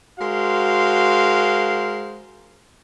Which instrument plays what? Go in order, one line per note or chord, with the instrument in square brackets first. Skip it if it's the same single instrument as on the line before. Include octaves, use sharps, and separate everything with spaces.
[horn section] G#3 F#4 A#4 C5 F5